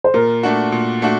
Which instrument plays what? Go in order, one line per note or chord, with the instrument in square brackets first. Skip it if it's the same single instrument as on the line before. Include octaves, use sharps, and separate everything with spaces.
[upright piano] C5
[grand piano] A#2 [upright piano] A#4
[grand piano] A3 D4 F#4
A#2
A3 D4 F#4